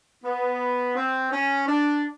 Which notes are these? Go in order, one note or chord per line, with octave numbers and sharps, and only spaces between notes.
B3
C4
C#4
D4